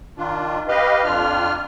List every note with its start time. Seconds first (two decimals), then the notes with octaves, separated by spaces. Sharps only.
0.18 D#3 D4 F4
0.68 G4 B4 D#5 F5
1.04 F2 D4 F4 F6